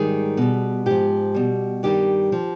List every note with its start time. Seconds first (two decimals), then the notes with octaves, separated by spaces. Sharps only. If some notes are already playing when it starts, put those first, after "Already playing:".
Already playing: G#2 D#3 G3 G#4
0.37 B2 G3
0.86 G#2 F3 G4
1.34 B2 G3
1.83 G2 D#3 G3 G4
2.32 F3